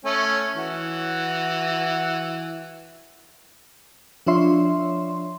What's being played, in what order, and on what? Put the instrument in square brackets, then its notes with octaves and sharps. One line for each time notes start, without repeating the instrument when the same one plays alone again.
[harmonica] A3 C#4 G#5
E3 F#4
[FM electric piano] F3 D4 F4 C#5 E5 C6